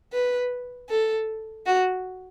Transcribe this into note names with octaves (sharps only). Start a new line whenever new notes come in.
B4
A4
F#4